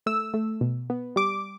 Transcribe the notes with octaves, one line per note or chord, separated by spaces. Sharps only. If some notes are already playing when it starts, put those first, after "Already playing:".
A3 E6
A3
B2
B3
G3 D6